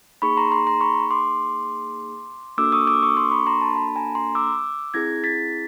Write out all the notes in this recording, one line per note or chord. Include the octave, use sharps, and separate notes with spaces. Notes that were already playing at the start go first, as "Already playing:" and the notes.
A#3 D#4 G#4 B5 C#6
A#5 C6
A#5 C6
A#5 C6
B5 C#6
C6 D6
A#3 D4 F#4 A4 D6 E6
C#6 D#6
D6 E6
C#6 D#6
C6 D6
B5 C#6
A#5 C6
A5 B5
A5 B5
G#5 A#5
A#5 C6
D6 E6
C4 E4 G#4 G#6 A#6
A6 B6